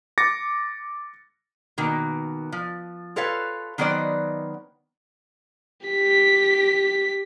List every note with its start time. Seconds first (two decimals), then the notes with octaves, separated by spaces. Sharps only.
0.18 D6 A6 A#6 C#7
1.78 B2 D#3 A#3
2.52 F3
3.16 F4 A4 B4 C#5 F5
3.78 D#3 F#3 B3 C5 D5 D#5
5.87 G4 B6